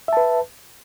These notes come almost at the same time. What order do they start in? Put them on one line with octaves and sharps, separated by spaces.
E5 A5 B4